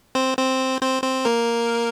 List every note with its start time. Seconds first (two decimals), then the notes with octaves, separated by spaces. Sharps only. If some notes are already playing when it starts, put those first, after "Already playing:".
0.15 C4 C5
0.37 C4 C5
0.81 C4 C5
1.03 C4 C5
1.25 A#3 A#4